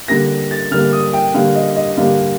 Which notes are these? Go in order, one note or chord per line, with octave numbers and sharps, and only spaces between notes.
D3 G3 A#3 A#6
A6
D3 G3 A#3 F6
D#6
G5
D3 G3 A#3 F5
D#5
D#5
D3 G3 A#3 F5